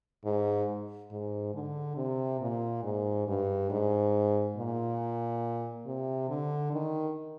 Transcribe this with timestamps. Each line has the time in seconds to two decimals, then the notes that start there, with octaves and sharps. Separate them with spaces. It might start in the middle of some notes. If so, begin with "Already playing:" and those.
0.25 G#2
1.11 G#2
1.54 D3
1.97 C3
2.41 A#2
2.84 G#2
3.27 G2
3.70 G#2
4.57 A#2
5.86 C3
6.29 D3
6.73 D#3